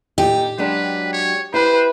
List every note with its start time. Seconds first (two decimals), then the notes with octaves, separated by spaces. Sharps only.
0.18 A#2 D#4 G4
0.58 F#3 G#3 D4 B4
1.13 C#5
1.54 E4 G4 B4 C5